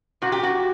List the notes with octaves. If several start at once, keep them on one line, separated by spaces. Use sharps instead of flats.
A#2 F#4
G4
F#4